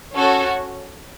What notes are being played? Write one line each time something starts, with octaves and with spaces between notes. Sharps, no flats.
C#4 F#4 A4 C#5